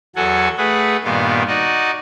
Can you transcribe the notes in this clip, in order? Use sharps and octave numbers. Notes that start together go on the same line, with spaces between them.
E2 F#3 F#4 A4 F#5 G#5
A3 G#4 B4 F#5
G2 A#2 D#3 B3 F5
D#4 F#4 D5 D#5